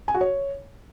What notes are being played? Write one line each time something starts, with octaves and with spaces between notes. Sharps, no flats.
G#5
F#4
C#5